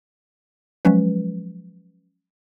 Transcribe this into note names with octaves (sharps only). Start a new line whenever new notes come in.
F3 F#3 G#3 C#4 B4